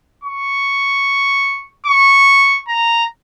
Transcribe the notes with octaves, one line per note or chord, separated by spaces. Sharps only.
C#6
C#6
A#5